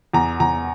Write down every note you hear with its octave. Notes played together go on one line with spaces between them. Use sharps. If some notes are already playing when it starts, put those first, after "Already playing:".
E2 A#5
E2 A#5